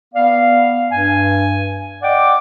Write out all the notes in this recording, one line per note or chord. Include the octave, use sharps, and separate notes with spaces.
B3 D5 F5
G2 G#5
D5 D#5 F#5 G5 D6